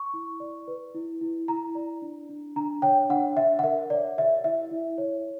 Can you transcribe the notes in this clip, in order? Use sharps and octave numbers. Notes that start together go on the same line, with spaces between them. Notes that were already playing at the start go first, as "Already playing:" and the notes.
Already playing: C#6
E4
D5
B4
E4
E4
E4 A#5
D5
D4
D4
D4 A#5
C#5 G5
D4 F#5
D4 E5
F#5
A#4 E5
C#5 D5
G4 E5
E4 E5
E4
C#5